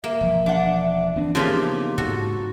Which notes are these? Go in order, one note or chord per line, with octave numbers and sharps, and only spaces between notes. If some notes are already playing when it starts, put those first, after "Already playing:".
A#3 E5
E1 F3
D4 F#5
E3 B3 C4 D4
C#3 F3 A#3 D#4 F4 G4
G#2 F#4 A4